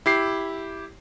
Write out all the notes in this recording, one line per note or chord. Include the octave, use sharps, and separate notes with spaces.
E4 G4 C7